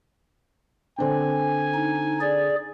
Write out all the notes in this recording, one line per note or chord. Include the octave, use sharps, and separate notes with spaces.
D3 C4 D4 G#5
D#4
G#4 D5